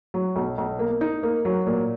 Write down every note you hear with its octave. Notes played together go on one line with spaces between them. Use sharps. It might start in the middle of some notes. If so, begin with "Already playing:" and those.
F#3
B1
B1
A#3
D#4
A#3
F#3
A#2